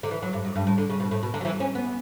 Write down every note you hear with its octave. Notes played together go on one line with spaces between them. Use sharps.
D3
E3
F#3
G2
F#2
G2
A2
D3
C#3
B2
A2
B2
D3
F#3
E3
C#4
B3